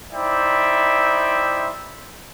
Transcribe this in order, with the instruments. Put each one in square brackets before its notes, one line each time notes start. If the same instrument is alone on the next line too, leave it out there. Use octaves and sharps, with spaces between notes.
[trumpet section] D#4 E4 C5 D5 E5 G5